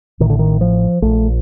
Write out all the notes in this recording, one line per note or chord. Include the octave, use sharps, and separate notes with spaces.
A1 A2 D#3
D3
D#3
F3
A#1 A#2 A3